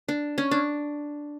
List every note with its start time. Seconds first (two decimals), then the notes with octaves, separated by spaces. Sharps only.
0.08 D4
0.38 C#4
0.51 D4